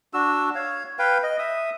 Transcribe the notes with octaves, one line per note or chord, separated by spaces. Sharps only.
D4 F#4 E6
C#5 F5
B4 F5 G5
D#5
E5 D#6